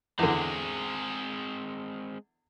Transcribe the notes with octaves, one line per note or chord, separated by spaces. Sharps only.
E2 D3 G#3 C4 G#4